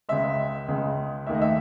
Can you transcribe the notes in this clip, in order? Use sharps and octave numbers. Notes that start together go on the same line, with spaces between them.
C#2 C#3 G#3 E5
C#2 C#3 G#3
D#2 D#3 A3 E5
D#5
E5